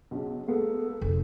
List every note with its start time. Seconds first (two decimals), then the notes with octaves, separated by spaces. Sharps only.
0.11 B1 C#3
0.48 G#3 A#3 B3 A4
1.01 F1 C3